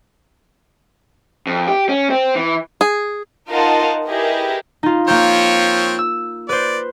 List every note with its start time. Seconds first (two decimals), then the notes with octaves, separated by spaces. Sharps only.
1.47 F2
1.68 G4
1.89 C#4
2.10 C4
2.35 E3
2.81 G#4
3.49 D#4 F4 A#4 D#5 F#5 A5
4.08 E4 G4 G#4 A#4 B4 D#5
4.83 D#4 F4
5.08 F3 A#3 C4 C#5 G6
5.99 E6
6.49 B4 C5 D5